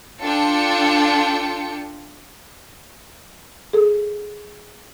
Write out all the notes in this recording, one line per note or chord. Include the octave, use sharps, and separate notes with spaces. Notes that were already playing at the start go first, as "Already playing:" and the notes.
D4 F4 A4 G5 C#7
G#4 A4